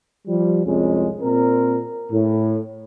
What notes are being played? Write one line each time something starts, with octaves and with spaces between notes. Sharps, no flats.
F3 G3
C2 F2 G#3 C#4
A#2 C4 A#4
A2